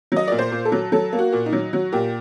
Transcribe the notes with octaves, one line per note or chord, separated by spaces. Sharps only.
F#3 D#5
A#2 D5
C5
A#2
A4
F#3
F#3 A4
A#3
F#4
A#2
D#4
F#3
F#3 F#4
A#2 G4